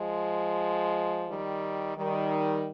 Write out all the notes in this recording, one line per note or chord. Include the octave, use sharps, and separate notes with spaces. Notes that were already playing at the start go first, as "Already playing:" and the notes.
Already playing: F3 G#3
D#3 G3
D#3 G3